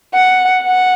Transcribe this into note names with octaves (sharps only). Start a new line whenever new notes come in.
F#5
F#5